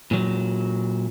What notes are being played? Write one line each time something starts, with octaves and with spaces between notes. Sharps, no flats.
A#2 F#3